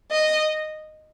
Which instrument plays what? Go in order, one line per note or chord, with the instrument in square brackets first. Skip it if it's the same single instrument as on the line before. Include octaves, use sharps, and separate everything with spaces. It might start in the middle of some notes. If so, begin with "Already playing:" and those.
[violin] D#5